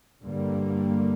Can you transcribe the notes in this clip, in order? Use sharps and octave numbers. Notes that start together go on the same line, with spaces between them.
G2 D3 G3 A#3